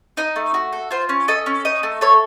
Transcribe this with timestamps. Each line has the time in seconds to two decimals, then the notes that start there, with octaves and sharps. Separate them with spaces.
0.17 D#4 D#5
0.36 A3
0.54 F#4
0.73 A4
0.91 F4 C5
1.09 C#4
1.28 A4 D#5
1.46 C#4
1.65 D#4 D#5
1.83 A3
2.01 A4 C#5